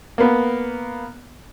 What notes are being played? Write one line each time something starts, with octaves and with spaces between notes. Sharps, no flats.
A#3 B3